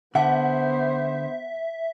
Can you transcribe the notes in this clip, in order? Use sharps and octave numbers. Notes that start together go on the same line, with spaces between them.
D3 B3 C5 E5 F#5